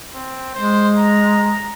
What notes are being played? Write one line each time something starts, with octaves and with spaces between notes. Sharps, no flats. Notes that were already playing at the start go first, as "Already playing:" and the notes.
C4
G#3 C5
A#5